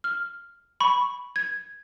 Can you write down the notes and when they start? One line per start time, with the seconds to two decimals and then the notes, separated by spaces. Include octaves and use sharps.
0.04 F6
0.80 B5 C#6
1.36 G#6